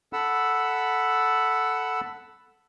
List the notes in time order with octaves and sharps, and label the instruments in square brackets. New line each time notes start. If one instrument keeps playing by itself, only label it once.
[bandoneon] A4 F#5 B5 E6